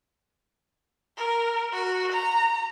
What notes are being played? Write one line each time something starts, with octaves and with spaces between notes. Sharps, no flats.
A#4
F#4
A#5